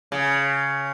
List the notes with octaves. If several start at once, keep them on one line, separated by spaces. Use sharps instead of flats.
C#3